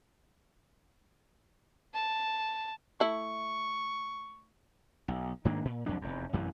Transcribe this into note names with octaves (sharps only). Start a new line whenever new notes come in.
A5
A3 E4 C#6
B1
G#2 D#3 A#3 D4
A#2
C2 F2 F#3 D4
F1 E2
A1 F#2 C3 E3